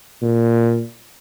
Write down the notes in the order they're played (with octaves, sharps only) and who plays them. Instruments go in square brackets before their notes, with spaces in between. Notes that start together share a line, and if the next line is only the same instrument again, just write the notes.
[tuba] A#2